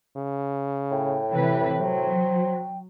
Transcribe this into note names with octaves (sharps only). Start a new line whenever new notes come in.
C#3
A2 G5
C3 E3 B4
F#3 C5